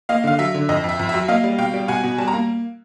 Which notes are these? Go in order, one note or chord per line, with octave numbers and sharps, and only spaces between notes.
A#3 D#5 F5
D3 F5
F#3 E5
D3
F2 D#5
F2
E5
F2
E5
F#3
A#3 D#5 F5
G3
B2 F5 G5
G3
B2 F#5 G#5
B2
G3 A5
A#5
A#3